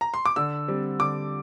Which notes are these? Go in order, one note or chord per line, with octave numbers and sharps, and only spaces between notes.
A#5
C6
D6
D3 E6
G3 C4
D3 D6